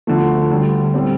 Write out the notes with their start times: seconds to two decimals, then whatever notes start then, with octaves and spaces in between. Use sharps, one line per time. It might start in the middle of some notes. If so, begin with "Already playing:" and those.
0.07 D2 D3 F3 A3
0.50 D2 D3 G3
0.94 A2 G3 C4